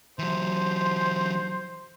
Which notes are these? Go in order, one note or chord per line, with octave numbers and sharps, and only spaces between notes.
E3 F#3 C5